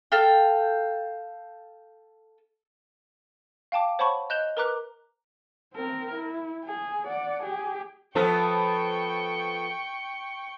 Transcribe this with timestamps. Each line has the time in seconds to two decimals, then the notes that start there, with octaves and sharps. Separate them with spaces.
0.12 A4 F5 G5
3.72 F5 G5 A5 D6
3.99 C5 C#5 F#5 A5 B5 C#6
4.30 D#5 F#6 G6 E7 F7 G7
4.57 A#4 B4 A#5 D6 F#6
5.74 C4 A#4
6.14 E4
6.64 G#4
7.07 D5 F#5
7.42 G4 G#4
8.15 F3 B3 A4 G5 C#6